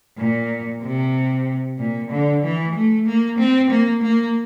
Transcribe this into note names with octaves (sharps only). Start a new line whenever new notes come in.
A#2
C3
A#2
D3
E3
A3
A#3
C4
A#3
A#3